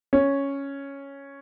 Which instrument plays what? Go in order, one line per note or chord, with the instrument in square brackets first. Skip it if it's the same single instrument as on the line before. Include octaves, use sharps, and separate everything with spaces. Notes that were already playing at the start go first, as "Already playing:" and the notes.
[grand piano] C#4